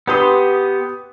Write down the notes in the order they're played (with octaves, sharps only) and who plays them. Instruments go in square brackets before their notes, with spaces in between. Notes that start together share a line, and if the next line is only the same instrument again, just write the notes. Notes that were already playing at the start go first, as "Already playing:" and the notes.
[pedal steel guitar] B3 G4 C6 [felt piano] B4 D#6